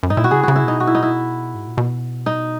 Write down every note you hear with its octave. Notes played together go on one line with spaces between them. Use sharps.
F#2
G#2 D#4
A#2 E4
B2 F#4
C#3 G#4
C#3 F#4
E4
B2 D#4
F#4
E4
D#4
E4
G#2
A#2
B2
D#4